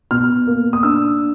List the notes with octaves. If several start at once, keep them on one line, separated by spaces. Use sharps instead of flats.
B2 F6
A#3
D#6
D4 E6